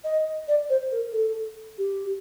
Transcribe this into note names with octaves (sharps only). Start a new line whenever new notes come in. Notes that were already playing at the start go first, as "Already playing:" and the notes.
D#5
D5
C5
A#4
A4
G4